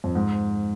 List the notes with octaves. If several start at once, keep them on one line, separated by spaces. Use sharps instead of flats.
F2
G#2